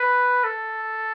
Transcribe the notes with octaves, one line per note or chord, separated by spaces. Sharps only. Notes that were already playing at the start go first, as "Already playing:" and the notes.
Already playing: B4
A4